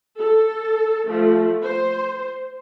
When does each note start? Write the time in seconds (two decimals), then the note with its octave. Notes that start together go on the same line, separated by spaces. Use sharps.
0.18 A4
1.08 F3 A3
1.63 C5